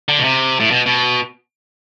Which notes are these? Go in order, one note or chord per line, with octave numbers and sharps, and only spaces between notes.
D3
B2
C3
A2
B2
B2